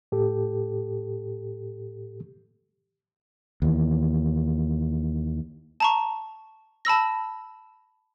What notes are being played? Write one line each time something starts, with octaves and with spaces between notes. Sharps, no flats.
A2 G4 A4
D#2 E3
A5 A#5 C#6
A5 B5 E6 A#6